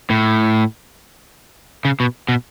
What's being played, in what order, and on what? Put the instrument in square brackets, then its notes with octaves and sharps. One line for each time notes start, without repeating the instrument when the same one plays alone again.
[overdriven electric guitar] A2
C#3
B2
B2